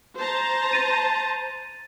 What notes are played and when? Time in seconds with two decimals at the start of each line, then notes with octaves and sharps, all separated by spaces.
0.19 C5 A5 A#5
0.73 A6 D#7